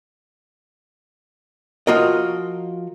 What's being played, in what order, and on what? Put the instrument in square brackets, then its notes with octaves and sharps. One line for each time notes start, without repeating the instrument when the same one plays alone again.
[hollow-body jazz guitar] F3 F4 F#4 A#4 D#5